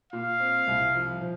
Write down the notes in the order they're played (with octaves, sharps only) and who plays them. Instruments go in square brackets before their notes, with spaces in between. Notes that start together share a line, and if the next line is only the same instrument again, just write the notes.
[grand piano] A#2 [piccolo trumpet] F5
[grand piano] C4
C2
F3
F3